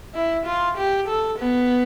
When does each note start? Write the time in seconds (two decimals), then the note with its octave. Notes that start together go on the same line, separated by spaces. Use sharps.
0.15 E4
0.46 F4
0.78 G4
1.08 A4
1.39 B3